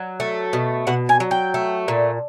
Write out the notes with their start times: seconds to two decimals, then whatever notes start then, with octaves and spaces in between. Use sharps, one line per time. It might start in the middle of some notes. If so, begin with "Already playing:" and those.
Already playing: F#3
0.20 A3
0.53 B2
0.87 B2 F#5
1.09 G#5
1.20 F#3
1.31 G5
1.54 A3
1.88 A#2